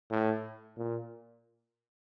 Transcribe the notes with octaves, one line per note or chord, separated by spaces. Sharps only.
A2
A#2